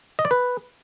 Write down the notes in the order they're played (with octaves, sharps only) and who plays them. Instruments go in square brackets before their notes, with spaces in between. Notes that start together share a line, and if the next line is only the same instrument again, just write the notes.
[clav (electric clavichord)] D#5
D5
B4